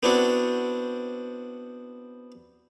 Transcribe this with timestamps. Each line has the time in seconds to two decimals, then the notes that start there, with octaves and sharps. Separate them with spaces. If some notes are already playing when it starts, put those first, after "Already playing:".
0.03 B3 C4 D4 E4 F#4